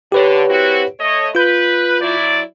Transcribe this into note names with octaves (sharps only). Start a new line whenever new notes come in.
D3 G4 B4 C#5
C4 E4 F#4
A3 C#5 D#5
F4 B4 G6
F#3 E4 D5